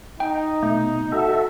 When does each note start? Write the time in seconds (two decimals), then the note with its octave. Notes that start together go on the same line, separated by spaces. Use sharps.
0.20 D#4 G5
0.63 B2 A3
1.12 F#4 A4 E5